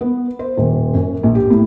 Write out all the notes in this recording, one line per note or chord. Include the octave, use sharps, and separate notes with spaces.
B3
C5
D#1
F#2
A#1
G4
A2